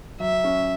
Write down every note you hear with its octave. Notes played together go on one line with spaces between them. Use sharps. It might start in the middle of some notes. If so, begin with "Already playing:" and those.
F#3 E5
C#4